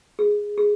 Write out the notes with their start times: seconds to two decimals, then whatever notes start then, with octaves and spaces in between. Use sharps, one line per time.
0.19 G#4
0.58 G#4